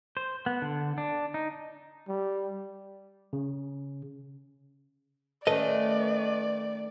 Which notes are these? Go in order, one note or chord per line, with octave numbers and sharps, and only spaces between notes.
C5
B3
D3
D4
D#4
G3
C#3
D#3 A3 C#4 A4 B4 D5 D#5